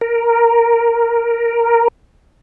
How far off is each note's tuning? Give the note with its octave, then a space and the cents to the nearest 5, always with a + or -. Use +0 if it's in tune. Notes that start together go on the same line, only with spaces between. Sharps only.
A#4 +0